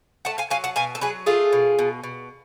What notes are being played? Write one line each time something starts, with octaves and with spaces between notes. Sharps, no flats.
A3 F#5 A5
F5 G#5
F#3 F5 G#5
F#5 A5
B2 F5 G#5
A4
F#3 G#4 B4
A3 F4 G#4
B2
B2
B2